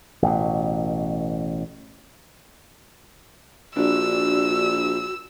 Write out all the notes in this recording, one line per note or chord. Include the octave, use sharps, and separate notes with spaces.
A1 B2
A#1 D4 F#4 E6